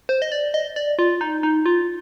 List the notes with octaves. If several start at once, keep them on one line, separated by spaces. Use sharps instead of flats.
C5
D#5
D5
D#5
D5
F4
D#4
D#4
F4